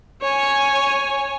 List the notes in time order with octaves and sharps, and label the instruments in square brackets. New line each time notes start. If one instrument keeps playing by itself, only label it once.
[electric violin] C#5 G#5